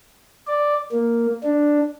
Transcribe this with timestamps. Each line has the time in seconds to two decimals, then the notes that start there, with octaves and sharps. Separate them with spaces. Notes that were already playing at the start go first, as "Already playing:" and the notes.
0.47 D5
0.92 A#3
1.43 D4